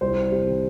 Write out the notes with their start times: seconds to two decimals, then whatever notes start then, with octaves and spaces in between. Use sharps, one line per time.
0.01 C2 C5
0.16 G3
0.32 C3
0.47 D#3